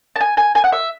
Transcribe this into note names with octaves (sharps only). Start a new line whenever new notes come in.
A5
G#5
G#5
G#5
F#5
E5